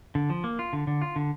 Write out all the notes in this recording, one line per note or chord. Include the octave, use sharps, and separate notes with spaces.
D3
F3
A#3
F4
D3
D3
F4
D3